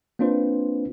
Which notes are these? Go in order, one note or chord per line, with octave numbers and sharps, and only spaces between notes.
A#3 C4 D4 F4 B4 C5